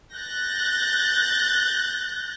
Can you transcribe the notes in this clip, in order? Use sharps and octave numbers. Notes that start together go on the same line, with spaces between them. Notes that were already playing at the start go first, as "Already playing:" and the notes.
F#6 G6 A6 A#6